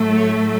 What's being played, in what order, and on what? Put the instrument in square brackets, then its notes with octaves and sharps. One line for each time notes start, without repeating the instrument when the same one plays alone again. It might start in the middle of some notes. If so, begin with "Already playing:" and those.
Already playing: [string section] A2 F#3 A3
C#5